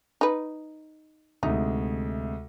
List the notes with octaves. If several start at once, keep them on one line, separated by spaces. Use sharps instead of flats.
D#4 B4
D2 C3 G#3 D#4